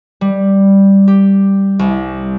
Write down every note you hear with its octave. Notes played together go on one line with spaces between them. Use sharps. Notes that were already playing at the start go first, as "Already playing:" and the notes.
G3
G4
C2